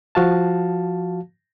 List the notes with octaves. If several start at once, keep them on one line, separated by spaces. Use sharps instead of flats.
F3 F#4 F5 A5